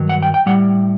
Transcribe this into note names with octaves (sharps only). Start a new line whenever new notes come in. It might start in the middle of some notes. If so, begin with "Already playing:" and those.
Already playing: G2 D#3 F#3
F#5
G5
G5
A2 G3 F#5